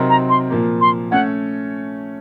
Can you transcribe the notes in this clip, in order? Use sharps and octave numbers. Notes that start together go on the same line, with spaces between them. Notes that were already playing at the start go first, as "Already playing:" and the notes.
Already playing: C3 F#3 C4 D#4 A#4
A#5
C6
A#2 F3 A#3
C6
A3 C#4 F#5